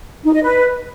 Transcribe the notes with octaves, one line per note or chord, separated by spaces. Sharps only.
D#4
D#5
B4